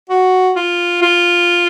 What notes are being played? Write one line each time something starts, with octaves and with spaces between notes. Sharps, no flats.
F#4
F4
F4